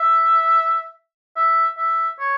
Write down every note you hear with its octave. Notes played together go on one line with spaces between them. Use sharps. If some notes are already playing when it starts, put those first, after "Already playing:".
Already playing: E5
E5
E5
C#5